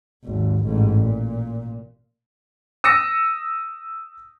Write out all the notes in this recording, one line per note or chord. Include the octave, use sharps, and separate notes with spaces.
G#1 D#2
A1 G#2
A#2
D#6 E6 A#6 C#7